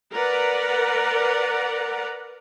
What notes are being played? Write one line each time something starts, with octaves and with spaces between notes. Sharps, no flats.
A#4 B4 D5 F#5 A#5